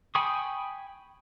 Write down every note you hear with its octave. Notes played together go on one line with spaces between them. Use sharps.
G5 G#5 B5 C#6 D#6